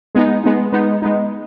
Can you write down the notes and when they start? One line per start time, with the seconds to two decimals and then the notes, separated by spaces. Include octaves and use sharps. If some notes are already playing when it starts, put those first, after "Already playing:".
0.15 G#3 B3 D#4
0.44 G#3 B3 D#4
0.72 G#3 B3 D#4
1.02 G#3 B3 D#4